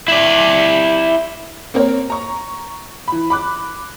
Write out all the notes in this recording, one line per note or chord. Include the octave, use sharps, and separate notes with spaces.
E4 D5
A#3 C4 A#4 C#5
A#5 C#6
E3 B5
B5 D6 F#6